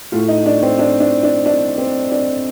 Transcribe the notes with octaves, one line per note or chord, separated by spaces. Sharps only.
A2 A3 F4
D#4
D4
C4
D4
D4
D4
D4
C4
D4